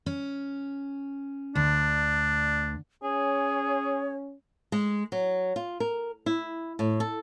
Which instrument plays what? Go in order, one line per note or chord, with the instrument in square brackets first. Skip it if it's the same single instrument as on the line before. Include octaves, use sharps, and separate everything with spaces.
[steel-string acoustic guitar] C#4
[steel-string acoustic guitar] D2 [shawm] D4
[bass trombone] C#4 [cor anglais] G#4 [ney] C#5
[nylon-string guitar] G#3
F#3
F4
A#4
E4
A2
A4